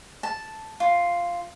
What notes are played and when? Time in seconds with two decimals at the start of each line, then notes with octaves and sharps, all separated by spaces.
0.23 A5
0.80 F4